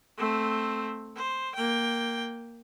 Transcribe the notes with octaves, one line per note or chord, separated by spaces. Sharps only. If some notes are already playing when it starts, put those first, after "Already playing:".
A3 C4
C5
A#3 G5